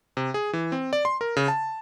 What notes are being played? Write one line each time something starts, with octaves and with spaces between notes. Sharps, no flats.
C3
G#4
E3
C4
D5
C6
A#4
C#3
A5